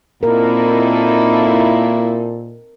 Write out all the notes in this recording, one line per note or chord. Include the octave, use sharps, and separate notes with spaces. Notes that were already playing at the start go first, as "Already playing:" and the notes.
A#2 A#3 C4 D#4 E4 A4 A#4